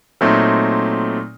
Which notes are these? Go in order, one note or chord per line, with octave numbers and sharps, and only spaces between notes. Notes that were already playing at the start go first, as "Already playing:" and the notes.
A#2 F#3 A3 C4 D#4